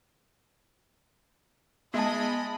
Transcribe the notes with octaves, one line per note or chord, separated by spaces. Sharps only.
G#3 B3 G#4 D#5 E5 A5 B5